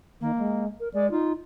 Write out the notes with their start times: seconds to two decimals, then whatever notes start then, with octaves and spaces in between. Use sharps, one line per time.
0.21 D#3 A#3
0.38 G#3
0.80 A#4
0.94 G#3 D5
1.11 D#4 F4